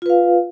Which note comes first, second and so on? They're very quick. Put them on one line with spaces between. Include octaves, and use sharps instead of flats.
F4 B4 F5